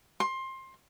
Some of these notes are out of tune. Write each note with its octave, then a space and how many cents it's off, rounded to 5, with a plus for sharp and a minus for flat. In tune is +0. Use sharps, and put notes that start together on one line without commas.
C6 +20